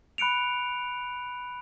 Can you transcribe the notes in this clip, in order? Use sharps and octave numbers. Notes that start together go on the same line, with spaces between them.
B5 F#6 C#7 D7 F7